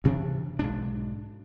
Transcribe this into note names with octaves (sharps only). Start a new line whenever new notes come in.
D2 C3 E3 D4
B1 G#2 D4